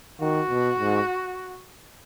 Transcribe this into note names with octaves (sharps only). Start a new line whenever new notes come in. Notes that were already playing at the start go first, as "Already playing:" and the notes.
D#3 F#4
B2
G#2